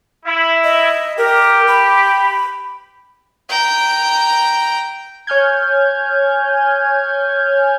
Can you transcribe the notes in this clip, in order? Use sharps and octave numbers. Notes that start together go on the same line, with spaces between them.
E4
D#5
G4 A#4
B5
G5 A#5
C#5 G#5 F6 G6 G#6